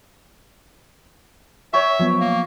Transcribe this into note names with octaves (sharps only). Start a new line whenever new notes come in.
C#5 E5 G5 C#6
F3 F#3 B3
A#3